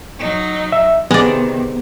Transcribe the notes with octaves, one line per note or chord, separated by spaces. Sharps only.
F#3 D#4
E5
C3 D#3 G#3 B3 D5